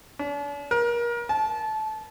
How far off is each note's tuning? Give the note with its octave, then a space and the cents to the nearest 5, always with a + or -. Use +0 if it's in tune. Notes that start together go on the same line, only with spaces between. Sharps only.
D4 -45
A#4 +30
A5 -20